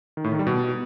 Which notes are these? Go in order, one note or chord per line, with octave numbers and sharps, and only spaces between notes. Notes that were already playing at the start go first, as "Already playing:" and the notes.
D#3
A2
D#3
G3
B2